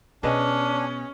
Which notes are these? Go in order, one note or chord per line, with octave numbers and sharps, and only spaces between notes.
B2 C#4 D4 G#4 B4 D#5